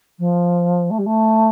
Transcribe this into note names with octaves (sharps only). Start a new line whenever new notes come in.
F3
A3
G3
A3